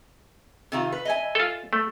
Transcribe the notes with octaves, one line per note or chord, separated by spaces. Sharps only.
C3 D#3 F4
B4
D#5 E5 G#5
F4 A4
A3